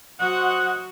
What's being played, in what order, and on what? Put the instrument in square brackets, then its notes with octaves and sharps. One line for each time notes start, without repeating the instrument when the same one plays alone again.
[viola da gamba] F#3 F#4 [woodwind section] C5 D#5 F#5